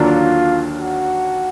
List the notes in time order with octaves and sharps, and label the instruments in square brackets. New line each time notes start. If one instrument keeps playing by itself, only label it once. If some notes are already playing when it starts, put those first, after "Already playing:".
Already playing: [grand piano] D#2 D3 F#3 A#3 D4 [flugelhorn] F4
[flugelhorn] F#4